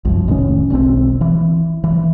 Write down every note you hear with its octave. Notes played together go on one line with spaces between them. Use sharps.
C2 F#2 F3
F1 A2 D#3 C#4
E1 B1 C3 C4
E3
E3